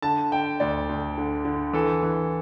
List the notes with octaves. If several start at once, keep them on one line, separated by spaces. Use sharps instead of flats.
D3 A5
D3 G5
D2 D5
D2
D3
D3
E3 A4
E3